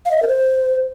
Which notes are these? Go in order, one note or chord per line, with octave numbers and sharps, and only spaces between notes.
F5
D#5
E5
A#4
C5